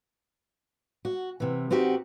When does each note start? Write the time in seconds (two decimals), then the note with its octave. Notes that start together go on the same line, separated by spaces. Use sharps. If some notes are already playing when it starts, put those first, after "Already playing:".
1.05 F#4
1.40 C3 E3
1.71 C4 D#4 F#4 G4 A#4